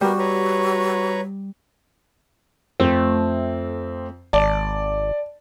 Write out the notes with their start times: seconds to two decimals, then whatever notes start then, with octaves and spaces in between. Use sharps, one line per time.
0.01 G3 B3 F#4 G4 A#4
0.19 B4 C#5 A#5
2.80 F2 A3 C4
4.33 G#1 D5 A5